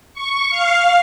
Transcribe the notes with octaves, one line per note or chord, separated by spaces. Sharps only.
C#6
F5